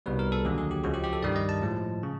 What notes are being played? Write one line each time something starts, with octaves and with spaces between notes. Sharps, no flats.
C2 B2 G3 B4
A#4
A4
D#2 D3 F#3 G#4
G#4
G4
C#2 C#3 F3 G#3 F#4
G4
G4
A4
G2 D#3 G3 D5
D#5
A5
A2 F3 G#3
C#3